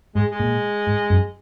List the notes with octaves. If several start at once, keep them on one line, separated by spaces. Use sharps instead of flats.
G#2 G#3
G#3
A#2
G#2
F#2